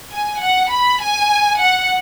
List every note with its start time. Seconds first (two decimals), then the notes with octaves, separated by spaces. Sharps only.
0.14 G#5
0.43 F#5
0.73 B5
1.02 G#5
1.61 F#5